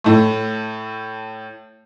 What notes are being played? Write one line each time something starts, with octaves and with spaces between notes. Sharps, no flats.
A2 A3